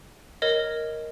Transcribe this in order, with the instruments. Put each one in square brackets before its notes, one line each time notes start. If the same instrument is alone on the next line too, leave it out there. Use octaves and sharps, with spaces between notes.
[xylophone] A#4 C#5 D#5